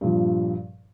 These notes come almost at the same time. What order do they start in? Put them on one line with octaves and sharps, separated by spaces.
G2 A#2 F3